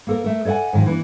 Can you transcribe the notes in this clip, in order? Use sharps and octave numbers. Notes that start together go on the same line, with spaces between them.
A#3 A4 A#4
A3 A#4
A4 D5 D#5 F#5 G#5
G#2 D#3 F3
E3 A#3 D4